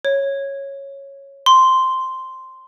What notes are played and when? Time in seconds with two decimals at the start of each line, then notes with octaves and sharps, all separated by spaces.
0.05 C#5
1.46 C6